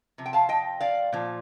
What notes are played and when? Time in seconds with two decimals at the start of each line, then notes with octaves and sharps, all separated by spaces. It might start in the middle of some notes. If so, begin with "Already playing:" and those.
0.18 C3 F3
0.26 G5
0.33 F5 A5
0.49 D#5 G5
0.80 D5 F5
1.12 A#2 F3